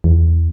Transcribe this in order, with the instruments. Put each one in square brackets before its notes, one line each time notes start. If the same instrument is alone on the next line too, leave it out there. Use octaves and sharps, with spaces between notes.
[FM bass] E2